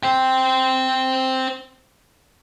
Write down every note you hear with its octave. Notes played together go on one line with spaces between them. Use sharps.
C5 G5